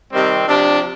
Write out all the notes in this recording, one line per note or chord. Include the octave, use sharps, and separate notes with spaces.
C3 D#3 G3 C4
C3 F3 D4